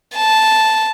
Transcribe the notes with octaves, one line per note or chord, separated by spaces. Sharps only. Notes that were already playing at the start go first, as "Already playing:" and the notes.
A5